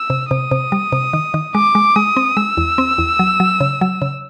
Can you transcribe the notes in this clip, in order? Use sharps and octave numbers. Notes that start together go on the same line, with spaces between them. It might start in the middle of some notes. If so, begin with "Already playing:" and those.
Already playing: E6
C3
C3 D#6
C3
G3
C3
D#3
D#3
G#3 D6
G#3
G#3 D#6
C4
G#3 E6
E2
C4
E2
F#3
F#3
C#3
F#3
C#3